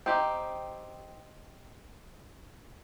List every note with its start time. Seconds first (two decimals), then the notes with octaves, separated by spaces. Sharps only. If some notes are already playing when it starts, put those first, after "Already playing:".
0.06 C4 D#4 G4